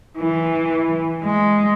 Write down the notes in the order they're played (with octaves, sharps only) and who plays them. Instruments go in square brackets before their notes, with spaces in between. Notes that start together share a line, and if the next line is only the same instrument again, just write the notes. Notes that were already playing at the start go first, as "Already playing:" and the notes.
[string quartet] E3
G#3